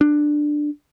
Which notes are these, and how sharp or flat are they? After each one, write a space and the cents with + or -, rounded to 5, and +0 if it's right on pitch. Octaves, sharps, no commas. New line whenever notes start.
D4 +10